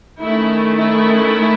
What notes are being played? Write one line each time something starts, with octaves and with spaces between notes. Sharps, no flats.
D#3 A3 C#4 E4
E4